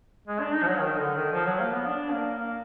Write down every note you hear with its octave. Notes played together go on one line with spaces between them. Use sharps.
G#3
D4
D#4
F3
F#3
D#3
D3
D#3
F3
F#3
A#3
B3
D4
A#3
A#3